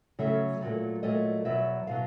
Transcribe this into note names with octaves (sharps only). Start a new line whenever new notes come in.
C#3 F#3 A3 C#4 E5
A#2 F#3 A3
A#2 F#3 A3 D#5
E2 B2 F#3 E5
B2 F#3 F5